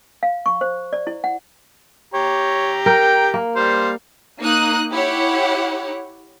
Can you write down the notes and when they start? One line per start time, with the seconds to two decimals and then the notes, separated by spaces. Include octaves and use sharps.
0.23 F5
0.46 C#6
0.61 C5
0.93 D5
1.07 E4
1.24 F#5
2.14 G4 C#5 A#5
2.86 A#4 G5
3.34 A#3
3.56 G3 C5 F5
4.40 A#3 D#4 D#6 F#6
4.92 E4 G4 C#5 F#5